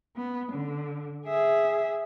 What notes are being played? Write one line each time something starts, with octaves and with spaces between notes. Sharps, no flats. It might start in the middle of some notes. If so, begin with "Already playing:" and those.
B3
D3
G#4 E5